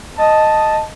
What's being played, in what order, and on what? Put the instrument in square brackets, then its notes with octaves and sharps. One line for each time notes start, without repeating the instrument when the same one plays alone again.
[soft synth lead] D#5 [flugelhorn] A5